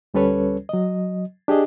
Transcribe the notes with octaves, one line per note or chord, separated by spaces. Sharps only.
D2 G3 C#4 A4 B4 C#5
F#3 D#5
D4 G4 G#4 D#5